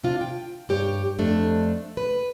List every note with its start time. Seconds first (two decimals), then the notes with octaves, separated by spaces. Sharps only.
0.03 C3 D4 F4
0.21 G5
0.69 G2 G4 C#5
1.18 F2 A3 D4
1.97 B4